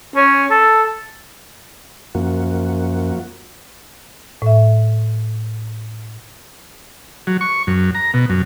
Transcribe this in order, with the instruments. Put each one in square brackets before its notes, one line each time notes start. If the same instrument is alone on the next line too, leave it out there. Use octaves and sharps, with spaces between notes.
[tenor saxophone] C#4
A4
[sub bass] F#2 [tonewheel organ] F3 A#3 F#4
[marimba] A2 E5
[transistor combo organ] F#3
C#6
F#2
A#5
B2
F#2